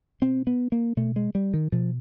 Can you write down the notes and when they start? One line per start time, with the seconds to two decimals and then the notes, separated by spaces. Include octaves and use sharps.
0.22 B2 C4
0.47 B3
0.72 A#3
0.97 B2 A3
1.16 G#3
1.35 G3
1.54 D#3
1.72 B2 F3